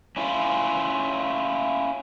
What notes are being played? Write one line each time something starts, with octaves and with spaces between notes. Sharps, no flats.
C#4 E4 F4